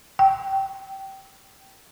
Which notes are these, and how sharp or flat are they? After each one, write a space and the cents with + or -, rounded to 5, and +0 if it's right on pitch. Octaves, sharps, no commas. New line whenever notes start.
G5 -20